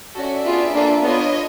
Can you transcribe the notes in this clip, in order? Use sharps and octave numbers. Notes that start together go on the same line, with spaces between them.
C#4 F#4 A4 D5 E5
B3 D4 F4 G#4
A#3 D4 F4 A4
B3 D4 F4 C#5 D#5